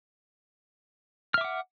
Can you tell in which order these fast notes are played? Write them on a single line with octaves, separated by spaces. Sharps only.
F6 E5 D6 F#5